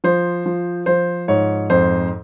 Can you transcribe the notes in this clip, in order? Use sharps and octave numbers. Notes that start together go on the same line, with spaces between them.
F3 C5
F3
F3 C5
G#2 C#5
F2 C5